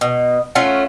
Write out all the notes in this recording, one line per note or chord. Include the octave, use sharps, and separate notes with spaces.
B2
A3 C#4 F4 F#5